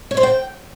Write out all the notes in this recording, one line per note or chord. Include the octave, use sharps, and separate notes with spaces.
C#5
C5
G5